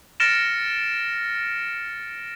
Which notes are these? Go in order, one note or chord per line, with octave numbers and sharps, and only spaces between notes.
F6 A6 A#6 C#7 D7 E7